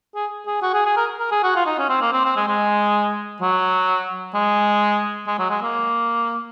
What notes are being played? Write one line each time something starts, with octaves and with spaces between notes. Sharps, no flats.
G#4
G#4
F#4
G#4
G#4
A#4
A#4
G#4
F#4
F4
D#4
C#4
C4
A#3
C4
C4
G#3
G#3
F#3
G#3
G#3
F#3
G#3
A#3